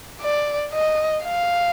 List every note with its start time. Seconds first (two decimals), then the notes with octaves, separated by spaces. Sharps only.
0.22 D5
0.73 D#5
1.24 F5